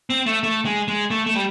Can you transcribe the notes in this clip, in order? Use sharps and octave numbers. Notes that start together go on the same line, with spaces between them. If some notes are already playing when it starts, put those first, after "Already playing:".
C4
A3
A3
G#3
G#3
A3
A3
G3